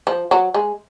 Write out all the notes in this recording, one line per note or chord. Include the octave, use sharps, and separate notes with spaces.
F3
F#3
G#3